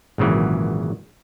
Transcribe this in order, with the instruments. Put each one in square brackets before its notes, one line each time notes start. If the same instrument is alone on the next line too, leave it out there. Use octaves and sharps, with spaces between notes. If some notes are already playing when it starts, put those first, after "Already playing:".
[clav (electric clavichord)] G#1 A#2 C#3 E3 F#3